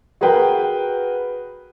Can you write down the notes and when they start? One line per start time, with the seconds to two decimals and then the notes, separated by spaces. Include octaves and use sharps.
0.21 F#4 G#4 A#4 B4 G5